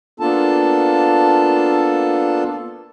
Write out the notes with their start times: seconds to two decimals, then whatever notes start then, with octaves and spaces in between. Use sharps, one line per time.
0.20 A#3 B3 D4 F4 A4 A5